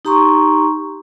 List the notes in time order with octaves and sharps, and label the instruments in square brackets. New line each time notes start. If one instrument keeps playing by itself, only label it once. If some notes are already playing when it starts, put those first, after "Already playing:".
[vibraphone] D#4 G4 A#5 C6 C#6